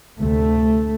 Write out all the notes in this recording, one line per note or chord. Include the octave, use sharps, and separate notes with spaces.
D2 C3 A3